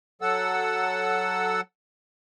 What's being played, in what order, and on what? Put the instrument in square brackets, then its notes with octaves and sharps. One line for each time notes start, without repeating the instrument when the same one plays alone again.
[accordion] F#3 A4 F#5 E6